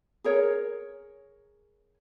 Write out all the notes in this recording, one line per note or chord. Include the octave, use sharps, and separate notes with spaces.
G#4 A#4 C#5